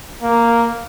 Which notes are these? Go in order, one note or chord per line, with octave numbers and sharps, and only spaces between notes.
A#3